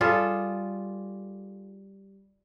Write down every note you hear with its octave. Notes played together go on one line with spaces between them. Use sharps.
G3 F4 G#4 A4